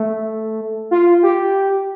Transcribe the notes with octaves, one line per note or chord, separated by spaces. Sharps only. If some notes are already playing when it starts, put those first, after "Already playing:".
Already playing: A3
F4
G4